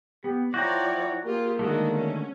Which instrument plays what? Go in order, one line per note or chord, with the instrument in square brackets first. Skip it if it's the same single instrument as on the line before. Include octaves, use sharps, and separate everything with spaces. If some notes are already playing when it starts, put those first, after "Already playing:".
[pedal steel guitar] B3 [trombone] G4
[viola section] F3 C#5 D5 [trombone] E4 [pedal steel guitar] F#4 G5 A#5
[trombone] A#3 [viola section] F4 G4 G#4
[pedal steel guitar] D3 D#3 A3 [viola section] G#3 D#4 F#4
[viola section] C#4